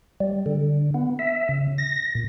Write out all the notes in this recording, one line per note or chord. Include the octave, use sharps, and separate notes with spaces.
G3
D3
B3
E5
C#3
A#6
A#2